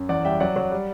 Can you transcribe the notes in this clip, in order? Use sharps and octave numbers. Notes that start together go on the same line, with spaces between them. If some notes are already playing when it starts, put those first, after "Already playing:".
Already playing: F#2
E2 D5 F#5
G3 E5 G5
F#3 D5 F#5
F#3
G3